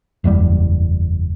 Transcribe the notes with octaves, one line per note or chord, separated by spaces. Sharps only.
F#1 E2 G#2 G3